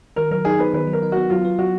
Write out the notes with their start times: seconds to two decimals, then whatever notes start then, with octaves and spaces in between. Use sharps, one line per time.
0.16 D#3 A#4
0.31 F#3 A#4
0.45 D#4 G#4
0.59 B3 B4
0.74 D#3 B4
0.87 F#3
0.93 A#4
1.03 D#4
1.12 B3 F#4
1.30 F#3 F4
1.45 B3
1.59 F#3 F#4